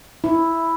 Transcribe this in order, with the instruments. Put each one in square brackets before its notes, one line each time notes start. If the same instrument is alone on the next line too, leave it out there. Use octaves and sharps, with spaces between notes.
[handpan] E4